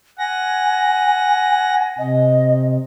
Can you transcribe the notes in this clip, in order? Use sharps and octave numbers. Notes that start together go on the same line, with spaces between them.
F#5 G#5 A#6
C3 D#5